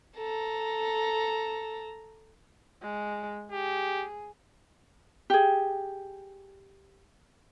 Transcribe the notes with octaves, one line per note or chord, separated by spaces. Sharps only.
A4 A#5
G#3
G4 G#4
G4 G#4